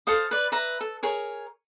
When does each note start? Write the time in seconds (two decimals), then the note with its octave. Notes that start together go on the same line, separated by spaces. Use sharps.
0.07 A4 C5 F5 D#6
0.31 B4 D5
0.52 B4 E5 A#5
0.81 A4
1.03 G#4 A#4 C#5